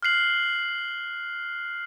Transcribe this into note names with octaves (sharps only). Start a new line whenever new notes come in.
F6 F#6 C7 F#7